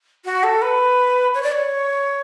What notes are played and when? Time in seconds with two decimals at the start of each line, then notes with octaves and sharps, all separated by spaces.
0.25 F#4
0.43 A4
0.62 B4
1.34 C#5
1.43 D5
1.52 C#5